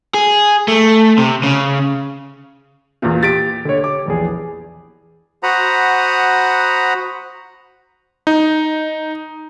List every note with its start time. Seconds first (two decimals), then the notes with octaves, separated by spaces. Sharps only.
0.14 G#4
0.68 A3
1.18 C3
1.43 C#3
3.02 E2 A#2
3.23 G4 A6 B6 D7
3.65 D3 C#5
3.84 D6
4.06 A#1 E2 G#4
5.43 F#4 C5 F#5 A#5 B5 D#6
8.27 D#4